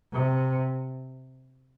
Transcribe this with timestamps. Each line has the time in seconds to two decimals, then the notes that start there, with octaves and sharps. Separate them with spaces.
0.13 C3